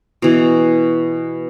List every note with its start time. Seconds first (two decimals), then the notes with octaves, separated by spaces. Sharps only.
0.22 B2 E3